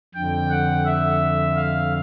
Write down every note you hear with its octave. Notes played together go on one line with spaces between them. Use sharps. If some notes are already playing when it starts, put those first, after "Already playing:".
F2 D3 G5
F#5
E5
F5